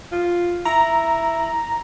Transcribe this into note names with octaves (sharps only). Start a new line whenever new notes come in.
F4
E4 A#5